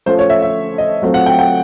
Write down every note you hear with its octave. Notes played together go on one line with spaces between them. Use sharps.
F3 A3 C#4 F4 C5
C#5
E5
E5
D#5
F#3 A3 C4 F4
F#5
G5
G5